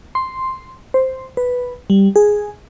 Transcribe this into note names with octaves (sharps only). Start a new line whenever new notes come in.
C6
C5
B4
G3
G#4